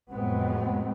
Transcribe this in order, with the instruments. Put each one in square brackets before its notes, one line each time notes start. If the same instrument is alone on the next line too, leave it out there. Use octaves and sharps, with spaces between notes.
[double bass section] F1 A2 F#3 G#3 B3 C4